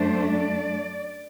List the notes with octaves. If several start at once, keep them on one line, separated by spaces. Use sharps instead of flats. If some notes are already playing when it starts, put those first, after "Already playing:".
Already playing: F#2 F#3 A3 D4 C5
D5